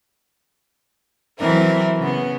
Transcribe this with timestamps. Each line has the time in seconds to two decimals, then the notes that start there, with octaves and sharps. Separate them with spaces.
1.38 E3 F#3 C4 E4 A#4
1.98 C#3 B3